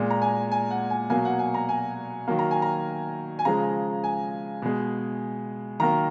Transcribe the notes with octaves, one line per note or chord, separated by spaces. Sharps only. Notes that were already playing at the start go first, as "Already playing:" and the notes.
Already playing: A#2 G#3
A#5
G#5
G#5
F#5
G#5
B2 F#3 A#3 G#5
F#5
G#5
A#5
G#5
D#3 F#3 A#3
A#5
G#5
A#5
G#5
C#3 F3 G#3 A#5
G#5
B2 G#3
D#3 F#3 A#3 A#5